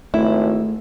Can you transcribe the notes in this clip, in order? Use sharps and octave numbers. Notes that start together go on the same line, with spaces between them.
G#1 A3 E4